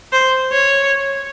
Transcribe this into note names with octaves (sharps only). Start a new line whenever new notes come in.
C5
C#5